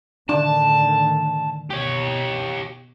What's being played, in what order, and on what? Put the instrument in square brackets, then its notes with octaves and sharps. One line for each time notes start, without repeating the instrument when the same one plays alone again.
[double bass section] A2 D3 D#3 [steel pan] D4 [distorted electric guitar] A5
[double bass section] B2 [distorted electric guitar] G4 C#5